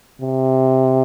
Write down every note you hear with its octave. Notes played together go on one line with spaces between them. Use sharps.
C3